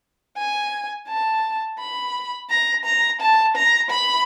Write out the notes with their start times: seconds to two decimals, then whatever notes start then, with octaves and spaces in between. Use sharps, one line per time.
0.37 G#5
1.08 A5
1.79 B5
2.50 A#5
2.85 A#5
3.21 A5
3.56 A#5
3.91 B5